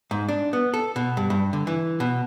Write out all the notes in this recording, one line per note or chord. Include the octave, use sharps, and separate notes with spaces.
G#2
D4
B3
A4
B2
G2
G2
D3
E3
B2